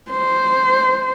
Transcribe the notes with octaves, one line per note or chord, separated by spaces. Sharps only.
C5